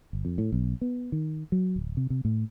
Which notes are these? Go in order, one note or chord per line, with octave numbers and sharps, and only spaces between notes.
G1
F2
A2
B1
B3
D#3
F#3
D1
C3
C3
A2